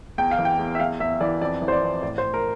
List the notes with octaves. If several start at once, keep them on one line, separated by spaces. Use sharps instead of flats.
E2 G5
F5
E3
G5
E2
E5
E2 F5
E2 E5
E3 D5
F2 D5
E3
C5
D5
F2
A2 D5
C5
A2
A#4